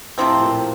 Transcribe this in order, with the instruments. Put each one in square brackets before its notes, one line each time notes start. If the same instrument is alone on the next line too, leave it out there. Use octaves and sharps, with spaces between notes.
[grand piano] A2 [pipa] C3 F3 C4
[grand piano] A#2